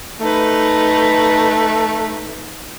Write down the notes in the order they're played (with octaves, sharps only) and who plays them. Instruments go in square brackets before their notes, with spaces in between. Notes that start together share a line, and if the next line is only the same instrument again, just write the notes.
[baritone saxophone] A3 [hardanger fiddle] D#4 B4